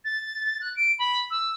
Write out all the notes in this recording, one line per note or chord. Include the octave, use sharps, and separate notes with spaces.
A6
F#6
D7
B5
E6